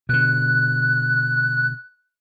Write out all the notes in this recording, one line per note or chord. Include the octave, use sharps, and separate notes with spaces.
B2 D3 F#6